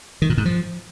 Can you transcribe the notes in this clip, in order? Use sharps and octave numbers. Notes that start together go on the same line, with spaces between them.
D#3
A#2
G#2
F3